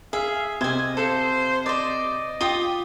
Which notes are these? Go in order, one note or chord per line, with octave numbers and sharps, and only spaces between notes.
G#4 E5 F5
C3 C5 D#5 G#5 G#6
A4 C5 F5
C5 D5 D#5
F4 G4 D#6 G7